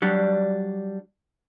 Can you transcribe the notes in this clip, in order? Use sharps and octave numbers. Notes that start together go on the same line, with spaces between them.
F#3 G3 D4